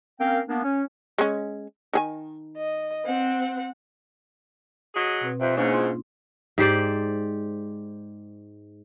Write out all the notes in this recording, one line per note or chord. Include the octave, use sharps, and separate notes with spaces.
A#3 C4 C#4 A#4 F5 G5
A#3 B3 D4
C#4
G#3 C#4
D#3 G#4 G#5
D#5
C4 F#5
F#3 G#4 D#5
B2 C4 B4
F2 C3
E2 G#2 C#3 A#3 C#4 D4
D#4 F4 C6
G#2 G4 C5 D5